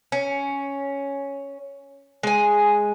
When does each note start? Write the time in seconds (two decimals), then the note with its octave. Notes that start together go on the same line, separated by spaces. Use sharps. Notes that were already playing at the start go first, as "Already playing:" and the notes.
0.12 C#4
2.23 G#3 G#5